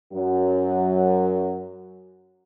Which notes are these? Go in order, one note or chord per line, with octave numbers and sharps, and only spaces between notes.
F#2 F#3 F#4